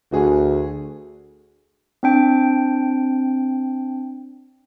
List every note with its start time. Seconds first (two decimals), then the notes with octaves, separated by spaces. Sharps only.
0.12 D2 F#4 G#4
2.03 C4 D4 G5